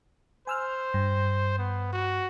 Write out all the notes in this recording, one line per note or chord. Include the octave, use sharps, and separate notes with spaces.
C5 G#5 E6 F6
G2
B3
F#4